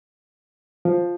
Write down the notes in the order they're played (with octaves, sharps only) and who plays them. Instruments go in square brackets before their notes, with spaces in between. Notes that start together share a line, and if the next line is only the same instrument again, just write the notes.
[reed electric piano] F3